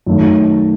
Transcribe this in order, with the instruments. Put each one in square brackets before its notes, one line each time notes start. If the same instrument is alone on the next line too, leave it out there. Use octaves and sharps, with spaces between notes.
[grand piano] F#2 D#3 F#3 A3